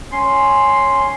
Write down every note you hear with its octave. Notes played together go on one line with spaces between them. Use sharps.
C#4 C6